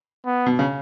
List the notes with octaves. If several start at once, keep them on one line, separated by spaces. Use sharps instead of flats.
B3
B2
C#3